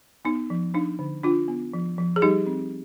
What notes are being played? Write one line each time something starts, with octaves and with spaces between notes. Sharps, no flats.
B3 D#4
F3
D4 D#4
D3
D4 F4
B3
F3
F3
G#4
G3 D#4 G4
C4